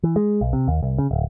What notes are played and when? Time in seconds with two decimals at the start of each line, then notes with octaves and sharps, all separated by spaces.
0.03 E3
0.16 G#3
0.41 B1
0.53 C3
0.68 D#2
0.83 C2
0.98 C#3
1.11 D1